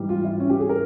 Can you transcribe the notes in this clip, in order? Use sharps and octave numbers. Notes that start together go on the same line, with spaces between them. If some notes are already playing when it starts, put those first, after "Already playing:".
Already playing: G#2 E3 G3
F4
E4
C#4
G4
G#4
A#4